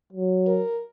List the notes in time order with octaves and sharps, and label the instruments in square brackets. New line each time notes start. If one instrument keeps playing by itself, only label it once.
[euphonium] F#3
[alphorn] A#4